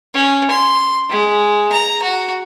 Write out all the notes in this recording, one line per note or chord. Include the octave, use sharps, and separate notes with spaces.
C#4
C6
G#3
A#5
F#4